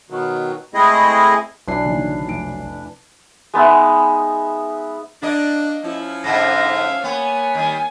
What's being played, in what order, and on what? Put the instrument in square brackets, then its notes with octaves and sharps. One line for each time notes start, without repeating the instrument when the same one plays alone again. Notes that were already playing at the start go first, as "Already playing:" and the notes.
[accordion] B2 D#3 F#3
G#3 A3 C4 E4 G#4 D#5
[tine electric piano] B1 F#3 C7 [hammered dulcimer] E3 D4
[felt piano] F#1 D3 D#3
F1 D7
[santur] G#3 B3 D#4 E5
[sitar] A#3 D#5 [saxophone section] D4 [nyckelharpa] D5
[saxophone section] F3 C#4 [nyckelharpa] E4
[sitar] G#2 B2 D3 [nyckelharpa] E5 F5 [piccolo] A#6
[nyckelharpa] A#3 C#5 [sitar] B3 [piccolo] G#5
[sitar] D#3 G3